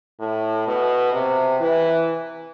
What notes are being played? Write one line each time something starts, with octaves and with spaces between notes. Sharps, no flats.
A2
B2
C3
E3